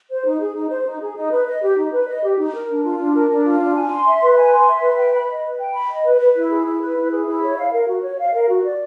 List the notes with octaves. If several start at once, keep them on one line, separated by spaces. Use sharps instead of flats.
C5
D#4
G#4
D#4
C5
D#4
G#4
D#4
B4
D#5
G4
D#4
B4
D#5
G4
D#4
A#4
D4
F4
D4
A#4
D4
F4
D4
G#5
C6
E5
B4
G#5
C6
E5
B4
G5
B5
D#5
B4
G5
B5
D#5
B4
B4
E4
G#4
E4
B4
E4
G#4
E4
C#5
F5
A#4
F#4
C#5
F5
A#4
F#4
D5